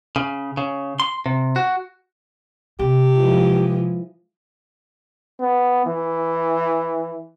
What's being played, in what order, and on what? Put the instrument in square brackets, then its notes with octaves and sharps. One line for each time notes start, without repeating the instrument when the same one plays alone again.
[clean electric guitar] C#3
C#3
C6
C3
F#4
[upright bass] C3 [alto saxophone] G4
[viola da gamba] E3 F3 G#3
[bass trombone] B3
E3